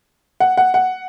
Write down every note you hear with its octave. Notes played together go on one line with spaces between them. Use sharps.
F#5
F#5
F#5